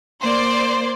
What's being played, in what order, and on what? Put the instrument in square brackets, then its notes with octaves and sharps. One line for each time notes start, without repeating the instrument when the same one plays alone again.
[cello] A#3 [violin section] C5 D5 C6